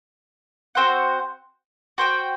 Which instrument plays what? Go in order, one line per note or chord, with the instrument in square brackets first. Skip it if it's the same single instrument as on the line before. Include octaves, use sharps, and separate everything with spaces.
[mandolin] C4 F#4 C5 F#5
F#4 C5 G5